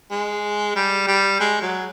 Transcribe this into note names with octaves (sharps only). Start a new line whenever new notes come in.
G#3
G3
G3
G#3
F#3